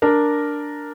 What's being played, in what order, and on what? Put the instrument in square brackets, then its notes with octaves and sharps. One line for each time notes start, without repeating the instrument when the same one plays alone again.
[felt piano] D4 A#4